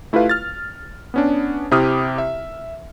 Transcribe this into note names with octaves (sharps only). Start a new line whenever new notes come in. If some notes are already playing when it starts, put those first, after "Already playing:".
A3 E4 F4 G4 B4 F5
F6 A6
B3 C#4 D4
C3 E4 G4 D#6 F6
E5